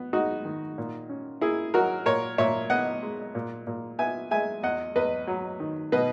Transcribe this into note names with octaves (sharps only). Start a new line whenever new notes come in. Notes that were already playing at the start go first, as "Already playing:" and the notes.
Already playing: B3
G#3 D#4 F#4
D#3
A#2
C#4
A#3 E4 G#4
F#3 F#4 A#4
A#2 A#4 C#5
A#2 C#5 E5
B3 D#5 F#5
G#3
A#2
A#2
B3 E5 G#5
G#3 E5 G#5
E2 D#5 F#5
E2 B4 D#5
F#3
D#3
B2 B4 D#5